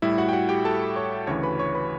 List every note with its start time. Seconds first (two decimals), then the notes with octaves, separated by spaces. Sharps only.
0.02 A2 G3 E4 E5
0.18 F#4 F#5
0.29 G5
0.33 F#4 F#5
0.49 G4 G5
0.65 A4 A5
0.96 C#5 C#6
1.27 D2 C#3 E3 C#5 C#6
1.43 B4 B5
1.59 C#5 C#6
1.74 B4 B5